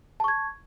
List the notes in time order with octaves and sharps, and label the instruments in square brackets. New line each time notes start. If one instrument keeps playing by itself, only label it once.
[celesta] A5
C#6
G#6